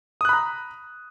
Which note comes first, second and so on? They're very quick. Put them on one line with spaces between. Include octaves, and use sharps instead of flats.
D#6 F#6 B5 A#5